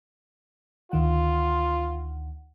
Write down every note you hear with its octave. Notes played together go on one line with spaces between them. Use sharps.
D2 D#3 F4 F#5